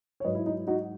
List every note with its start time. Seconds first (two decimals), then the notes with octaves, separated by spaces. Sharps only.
0.20 C#5
0.24 G#2 F#3 B4 D#5
0.35 E4
0.46 D#4
0.57 E4
0.67 D#4 F#4